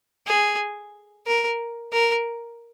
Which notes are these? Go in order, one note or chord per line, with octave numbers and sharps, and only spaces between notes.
G#4
A#4
A#4